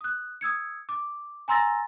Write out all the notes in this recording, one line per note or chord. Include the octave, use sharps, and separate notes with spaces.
D#6 F#6
D#6 E6 G#6 C#7
D6
G#5 A#5 C6 E6 A6 A#6